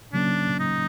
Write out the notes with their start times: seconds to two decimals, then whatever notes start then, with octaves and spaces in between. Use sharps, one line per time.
0.13 C#3 F#3 A#3 C#4 D4
0.60 D#4